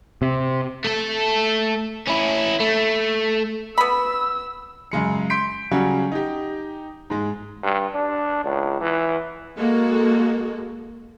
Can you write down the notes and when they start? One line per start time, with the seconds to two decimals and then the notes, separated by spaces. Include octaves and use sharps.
0.22 C3
0.85 A3 A4
2.07 C#4 E4
2.60 A3
3.78 B3 B5 E6
4.92 F#2 C#3 G#3 C#7
5.30 C6 G6 B6 D7
5.71 C#3 F#3 G3 C#4 F#4
6.12 D#4 G4
7.10 G#2 G#3
7.63 G2
7.95 D4
8.45 C#2
8.81 E3
9.57 G#3 A#3 F#4 A4